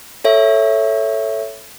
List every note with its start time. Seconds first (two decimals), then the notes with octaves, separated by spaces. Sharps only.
0.24 A4 C#5 E5